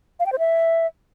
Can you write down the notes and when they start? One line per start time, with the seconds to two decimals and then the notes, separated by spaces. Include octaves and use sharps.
0.20 F5
0.26 G5
0.32 C5
0.39 E5